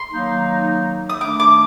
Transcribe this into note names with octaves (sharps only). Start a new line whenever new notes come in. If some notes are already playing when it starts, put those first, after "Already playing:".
Already playing: C6
D#3 F#3 A#3 D#4
D#6
D#3 A3 D4 D6
D6